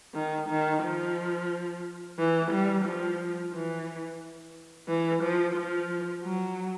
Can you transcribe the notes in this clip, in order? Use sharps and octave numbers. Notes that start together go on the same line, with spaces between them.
D#3
D#3
F3
E3
G3
F3
E3
E3
F3
F3
F#3